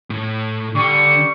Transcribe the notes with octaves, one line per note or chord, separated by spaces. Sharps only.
A2
D3 G3 C#6